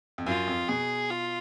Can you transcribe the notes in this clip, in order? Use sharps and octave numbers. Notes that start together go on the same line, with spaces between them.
F2
F#2 F4
F2
B2 G#4
F4